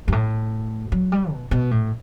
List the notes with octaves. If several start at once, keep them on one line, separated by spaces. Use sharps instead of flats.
G2
A2
F#3
G3
B2
B2
A2